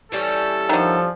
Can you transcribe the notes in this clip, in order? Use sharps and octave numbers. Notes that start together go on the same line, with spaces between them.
E3 G3 C#4 A4
D3 D#3 F3